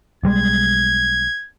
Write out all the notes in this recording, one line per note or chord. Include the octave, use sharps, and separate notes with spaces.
B1 G3 G#3 G#6